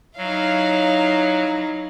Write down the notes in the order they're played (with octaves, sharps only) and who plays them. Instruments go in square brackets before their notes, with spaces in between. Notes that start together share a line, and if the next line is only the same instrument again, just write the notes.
[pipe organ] F#3 [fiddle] D#4 E4 [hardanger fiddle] C#5 F5